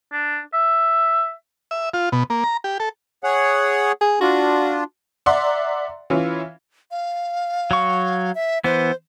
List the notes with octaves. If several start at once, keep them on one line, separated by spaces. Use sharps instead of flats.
D4
E5
E5
F4
B2
A#3
A#5
G4
A4
G#4 C#5 F#5
G#4
D4 F4 F#4
D5 E5 F#5 A#5 C6
E3 C#4 E4 F4
F5
F#3 C#6
E5
E3 B3 C5